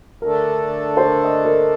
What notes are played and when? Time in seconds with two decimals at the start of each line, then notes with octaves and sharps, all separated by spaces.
0.21 D3 A3 D4 A4 A#4
0.97 C5
1.04 A#4
1.24 D#5
1.45 A#4